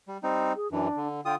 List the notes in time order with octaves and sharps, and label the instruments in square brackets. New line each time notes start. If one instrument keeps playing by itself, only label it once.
[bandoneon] G3
G3 C4 D#4
[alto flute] G#4
[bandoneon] F#2 E3 [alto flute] D4
[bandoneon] D3
[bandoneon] D3 F4 D#6 [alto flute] G5